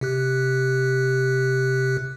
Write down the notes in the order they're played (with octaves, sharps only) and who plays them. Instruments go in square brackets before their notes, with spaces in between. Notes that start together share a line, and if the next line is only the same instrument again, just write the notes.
[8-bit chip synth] C3 G4 F#6